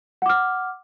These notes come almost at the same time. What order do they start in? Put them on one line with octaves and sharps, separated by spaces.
F#5 D6 F6